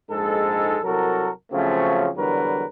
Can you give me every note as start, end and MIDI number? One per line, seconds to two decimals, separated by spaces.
0.10 0.78 34
0.10 0.78 44
0.10 0.78 56
0.10 0.78 63
0.10 0.78 69
0.84 1.30 36
0.84 1.30 54
0.84 1.30 66
0.84 1.30 69
0.84 1.30 70
1.53 2.09 49
1.53 2.09 53
1.53 2.09 54
1.53 2.09 57
1.53 2.09 60
1.53 2.09 61
2.16 2.65 40
2.16 2.65 50
2.16 2.65 54
2.16 2.65 55
2.16 2.65 70
2.16 2.65 71